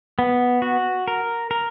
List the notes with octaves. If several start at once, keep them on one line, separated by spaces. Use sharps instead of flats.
B3
F#4
A#4
A#4